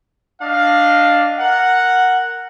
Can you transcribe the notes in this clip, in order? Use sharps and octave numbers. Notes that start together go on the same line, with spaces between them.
D4 D#5 F5
A#4 F#5